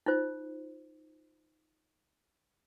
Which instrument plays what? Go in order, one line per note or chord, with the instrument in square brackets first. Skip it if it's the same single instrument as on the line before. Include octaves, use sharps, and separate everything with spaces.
[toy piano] D#4 F4 C5